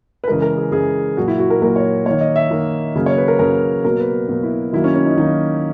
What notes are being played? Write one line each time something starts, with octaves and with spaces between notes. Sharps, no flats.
B4
C#3 E3 G#3 A#4
A#4
G#4
C#3 E3 G#3 G#4
A#2 F#3 A#3 F#4
E4
F#4
A#4
A#2 F#3 A#3 A#4
C#5
D#3 A#3 C#5
D#5
E5
D#3 A#3
C#3 F#3 A#3
C#5
B4
A#4
C#3 F#3 A#3 A#4
B2 F#3 A#3 A#4
B4
B2 F#3 A#3
E4
D#3 F#3 A#3 E4
C#4
C#4
D#4
D#3 F#3 A#3 D#4